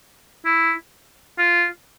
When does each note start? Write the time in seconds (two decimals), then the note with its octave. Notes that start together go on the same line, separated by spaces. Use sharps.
0.45 E4
1.38 F4